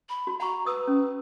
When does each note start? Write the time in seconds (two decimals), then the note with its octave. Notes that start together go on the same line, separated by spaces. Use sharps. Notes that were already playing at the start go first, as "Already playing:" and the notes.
0.09 B5
0.27 F#4
0.40 F#5 A#5 C#6
0.66 B4 D#6 E6
0.87 C#4